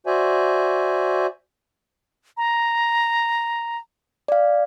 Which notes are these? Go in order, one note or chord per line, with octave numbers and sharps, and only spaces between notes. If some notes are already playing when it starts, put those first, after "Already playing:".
F#4 C5 D5 E5 G#5
A#5
D5 F5